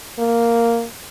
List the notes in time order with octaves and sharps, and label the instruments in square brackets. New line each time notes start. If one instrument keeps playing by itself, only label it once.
[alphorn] A#3